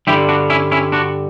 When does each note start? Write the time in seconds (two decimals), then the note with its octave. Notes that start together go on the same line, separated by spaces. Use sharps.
0.07 G2 D3 G3 E4 G4
0.29 D4 F#4
0.50 C#4 E4
0.71 C#4 E4
0.92 D4 F#4